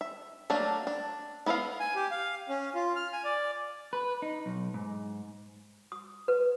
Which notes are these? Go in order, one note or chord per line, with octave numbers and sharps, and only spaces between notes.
E5
F#3 A3 A#3 D4
D4
B3 E4 B4 E5 F5
G#5
G4
F5
C#4
F4
F6
G#5
D5
B4
D#4
B1
G#2
D#6
B4